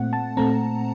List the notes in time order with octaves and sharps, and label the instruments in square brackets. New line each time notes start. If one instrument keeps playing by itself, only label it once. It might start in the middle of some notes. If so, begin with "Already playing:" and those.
Already playing: [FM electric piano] A#2 A3 C4 F#5
A5
A#2 A3 C4 A#5